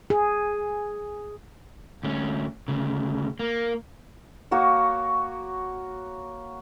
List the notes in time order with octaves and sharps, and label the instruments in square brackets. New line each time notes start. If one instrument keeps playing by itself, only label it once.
[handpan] G#4
[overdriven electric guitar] D2 C#4
D2 C#3
A#3
[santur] A#3 F#4 C#5